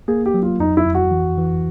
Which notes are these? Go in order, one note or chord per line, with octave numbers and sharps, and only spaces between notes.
A#3 G#4
G4
F#3
F4
F2 D#4
E4
F2
F#4
E3
E3